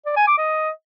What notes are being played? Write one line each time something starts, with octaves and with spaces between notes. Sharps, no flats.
D5
G#5
D6
D#5